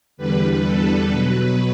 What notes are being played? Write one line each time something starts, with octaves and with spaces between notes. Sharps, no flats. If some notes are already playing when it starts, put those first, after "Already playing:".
E2 D3 G3 B4
A4
B2 F#3 B4